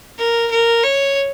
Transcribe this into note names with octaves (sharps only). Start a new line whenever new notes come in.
A#4
A#4
C#5